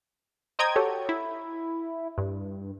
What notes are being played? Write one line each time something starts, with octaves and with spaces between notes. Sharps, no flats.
C5 D#5 G5 A#5 D#6 G#6
F#4 G4 A4 C#5
E4
G2